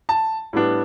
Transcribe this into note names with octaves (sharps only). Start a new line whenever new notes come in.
A5
A2 G3 B3 D4